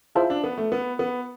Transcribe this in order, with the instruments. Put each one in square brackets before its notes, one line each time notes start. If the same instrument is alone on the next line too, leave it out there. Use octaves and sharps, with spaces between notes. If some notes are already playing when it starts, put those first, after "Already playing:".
[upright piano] E4 [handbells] F4 G#4 C5 F5 A5
[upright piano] D4
B3
A3
B3
B3